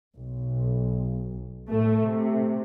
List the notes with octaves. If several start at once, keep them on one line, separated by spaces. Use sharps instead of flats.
B1
A2 A3
C3